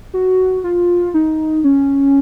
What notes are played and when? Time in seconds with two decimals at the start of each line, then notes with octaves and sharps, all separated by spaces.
0.14 F#4
0.64 F4
1.14 D#4
1.64 C#4